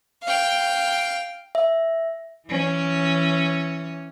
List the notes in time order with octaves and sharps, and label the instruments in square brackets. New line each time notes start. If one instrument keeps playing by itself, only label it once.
[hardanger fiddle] F5 G5
[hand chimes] E5
[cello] E3 C#4